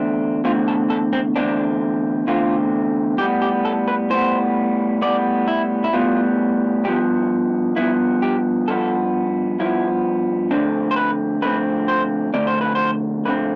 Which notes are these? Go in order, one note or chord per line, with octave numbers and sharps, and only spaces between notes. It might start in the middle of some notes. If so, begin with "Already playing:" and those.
Already playing: E2 D3 A3 C4
E2 D3 A3 C4 F4
A4
A4
C4
E2 D3 A3 C4 D4
E2 D3 A3 C4 F4
A2 G3 B3 G4
G4
A4
B4
A2 G3 B3 C5
A2 G3 B3 D5
E4
E4
A2 G3 B3 F4
G2 F3 B3 G4
G2 F3 B3 E4
G4
G2 F3 B3 A4
G2 F3 B3 E4
F2 D3 A3 C4 D4
C5
B4
F2 D3 A3 C4 B4
C5
F2 D3 A3 C4 D5
C5
B4
C5
F2 D3 A3 C4 B4